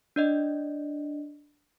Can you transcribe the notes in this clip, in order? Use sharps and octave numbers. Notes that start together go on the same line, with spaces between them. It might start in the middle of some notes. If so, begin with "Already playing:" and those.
D4 D5 D#5